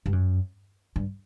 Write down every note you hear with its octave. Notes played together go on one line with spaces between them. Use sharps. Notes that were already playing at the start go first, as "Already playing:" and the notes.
G2
F#2
G2